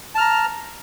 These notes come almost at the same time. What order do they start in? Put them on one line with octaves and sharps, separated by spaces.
A5 F6 A#5